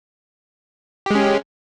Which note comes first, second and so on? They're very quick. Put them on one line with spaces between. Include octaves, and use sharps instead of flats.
G4 G#3 C#4